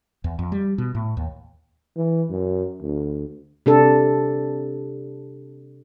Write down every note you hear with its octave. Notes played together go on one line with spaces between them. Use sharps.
E2
F2
G3
B2
A2
D#2
E3
F#2
D2
C3 D4 A4